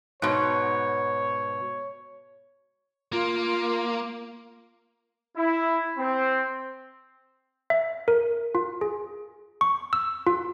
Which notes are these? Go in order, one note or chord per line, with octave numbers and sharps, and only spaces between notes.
G#2 B2 C#5
A#3 F4
E4
C4
E5
A#4
F4
G#4
C#6
E6
F4